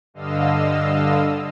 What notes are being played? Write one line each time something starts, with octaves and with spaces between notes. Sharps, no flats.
G2 D3 D#5 F5 E6